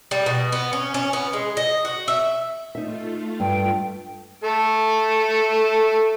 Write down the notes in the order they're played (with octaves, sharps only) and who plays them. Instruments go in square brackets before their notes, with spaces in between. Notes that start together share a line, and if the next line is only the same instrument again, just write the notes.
[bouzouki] G3
B2
B3
C#4
C#4
B3
G#3
D#5
F#4
E5
[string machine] A3 F4 [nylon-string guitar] D#4 E5
[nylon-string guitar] G2 [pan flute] G5
[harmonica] A3 A4